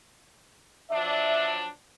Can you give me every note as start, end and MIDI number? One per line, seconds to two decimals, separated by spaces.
0.91 1.67 53
0.91 1.67 54
0.91 1.67 62
0.91 1.55 76